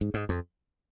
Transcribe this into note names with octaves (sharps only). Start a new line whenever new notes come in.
G#2
G#2
F2